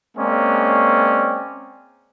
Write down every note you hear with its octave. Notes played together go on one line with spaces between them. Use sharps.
G#3 A#3 C4 C#4 D5